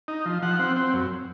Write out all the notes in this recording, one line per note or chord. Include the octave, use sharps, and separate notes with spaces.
D#4
F3
F3 F#5
C4
C4
F#2